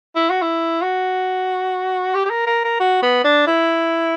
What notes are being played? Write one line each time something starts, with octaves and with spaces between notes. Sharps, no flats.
E4
F#4
E4
F#4
G4
G4
A#4
A#4
A#4
F#4
B3
D4
E4